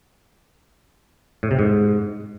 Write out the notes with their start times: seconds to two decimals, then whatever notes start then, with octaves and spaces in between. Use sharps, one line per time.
1.43 A2
1.51 C3
1.59 G#2